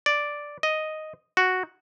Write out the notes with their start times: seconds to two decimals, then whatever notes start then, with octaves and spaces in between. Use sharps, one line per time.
0.06 D5
0.63 D#5
1.37 F#4